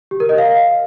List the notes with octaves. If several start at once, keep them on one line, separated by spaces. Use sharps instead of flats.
G4
A#4
D#5
F5